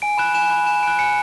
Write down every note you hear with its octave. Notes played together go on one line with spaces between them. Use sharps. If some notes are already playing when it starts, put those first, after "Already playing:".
G#5 D7
B5 F#6 E7
G#5 E7
B5 F#6 E7
G#5 E7
B5 F#6 D7
G#5 C#7